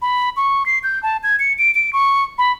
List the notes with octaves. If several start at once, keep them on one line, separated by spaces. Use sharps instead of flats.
B5
C#6
C7
G6
A5
G#6
C#7
D7
D7
C#6
B5